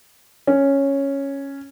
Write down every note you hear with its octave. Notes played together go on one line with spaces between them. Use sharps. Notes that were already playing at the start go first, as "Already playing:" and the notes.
C#4